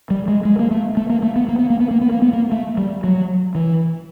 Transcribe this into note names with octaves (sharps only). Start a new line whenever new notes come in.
G3
G#3
G#3
A#3
A3
A3
A#3
A3
B3
A#3
B3
A#3
B3
A#3
B3
A#3
B3
A#3
A3
G3
F#3
E3